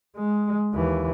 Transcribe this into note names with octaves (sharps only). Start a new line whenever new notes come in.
G#3
D#2 E3